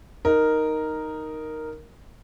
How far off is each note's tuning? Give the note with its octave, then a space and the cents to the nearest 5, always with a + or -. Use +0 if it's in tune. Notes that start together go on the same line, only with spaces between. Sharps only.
D#4 +0 A#4 +0